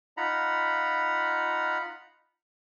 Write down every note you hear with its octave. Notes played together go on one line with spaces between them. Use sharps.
D#4 F4 F#5 A#5 B5